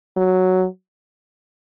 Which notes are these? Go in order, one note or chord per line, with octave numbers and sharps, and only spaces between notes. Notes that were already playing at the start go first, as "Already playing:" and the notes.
F#3